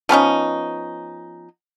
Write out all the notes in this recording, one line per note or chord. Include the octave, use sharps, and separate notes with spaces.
F3 B3 C#4 D#4